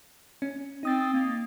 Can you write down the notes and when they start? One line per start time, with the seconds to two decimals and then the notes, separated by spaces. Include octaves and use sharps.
0.42 C#4
0.83 C4 D#4 D#6 A6
1.13 A#3